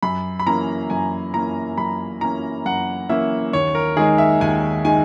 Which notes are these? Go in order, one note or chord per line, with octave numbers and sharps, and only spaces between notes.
F#2 B5
B5
E3 A#3 C#4 A#5
F#2 G#5
E3 A#3 C#4 A#5
F#2 B5
E3 A#3 C#4 A#5
F#2 F#5
E3 A#3 C#4 E5
D#2 C#5
A#4
D#3 G#3 D#4 G#4
E5
D#2 G#5
D#3 G#3 D#4 G#5